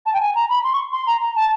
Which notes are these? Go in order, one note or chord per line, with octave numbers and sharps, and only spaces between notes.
A5
G5
G#5
A#5
B5
C6
C#6
C6
A#5
A#5
A5